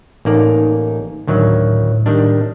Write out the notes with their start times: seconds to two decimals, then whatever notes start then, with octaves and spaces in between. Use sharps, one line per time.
0.25 A1 A#3 D#4 D5
1.27 D2 A2 D#3 F#3
2.06 D#3 G3 D4